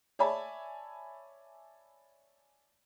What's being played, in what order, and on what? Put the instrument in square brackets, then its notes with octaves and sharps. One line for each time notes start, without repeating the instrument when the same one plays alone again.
[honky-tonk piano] C#5 D5 E5 G#5 A5 B5